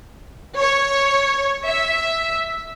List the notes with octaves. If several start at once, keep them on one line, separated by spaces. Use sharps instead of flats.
C#5
E5